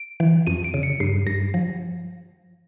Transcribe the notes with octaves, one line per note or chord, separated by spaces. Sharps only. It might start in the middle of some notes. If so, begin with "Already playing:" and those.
Already playing: D7
E3
F2 D#7
D7
C#3
C#7
G2 C7
G2 A#6
F3